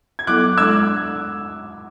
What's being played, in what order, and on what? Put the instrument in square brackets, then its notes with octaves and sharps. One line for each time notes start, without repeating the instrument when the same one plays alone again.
[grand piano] G#6
[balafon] F#3 B3 E4 A4 [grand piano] D6 F#6
[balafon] G#3 D4 A4 D5 [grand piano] E6 G#6